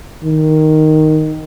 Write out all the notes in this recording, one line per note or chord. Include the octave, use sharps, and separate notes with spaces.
D#3